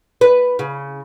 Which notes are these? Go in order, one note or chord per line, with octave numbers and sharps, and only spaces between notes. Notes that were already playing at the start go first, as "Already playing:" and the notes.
B4
C#3